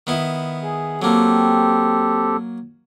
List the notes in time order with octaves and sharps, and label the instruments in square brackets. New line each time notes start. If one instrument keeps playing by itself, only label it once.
[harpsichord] D#3 B3 E4
[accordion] G#4
[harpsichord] F#3 A#3 [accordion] C4 G4 A4